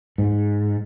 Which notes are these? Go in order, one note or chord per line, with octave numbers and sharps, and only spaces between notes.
G#2